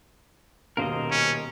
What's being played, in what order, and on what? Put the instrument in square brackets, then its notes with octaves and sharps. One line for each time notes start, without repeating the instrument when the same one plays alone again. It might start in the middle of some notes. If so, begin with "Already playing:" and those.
[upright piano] D#1 B2 F5 [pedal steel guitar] A#4 C5 D#5
[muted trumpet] C#4